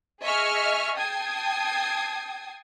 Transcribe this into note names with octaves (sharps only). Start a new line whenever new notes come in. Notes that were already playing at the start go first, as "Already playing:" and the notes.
G#4 D#5 E5 G#5 C#6 F6
G5 A5 D#6 G#6 C7